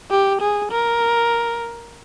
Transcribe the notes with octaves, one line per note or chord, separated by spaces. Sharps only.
G4
G#4
A#4